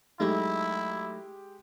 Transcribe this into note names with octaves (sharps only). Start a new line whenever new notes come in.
F#3 G#3 A3 D#4 E4 G4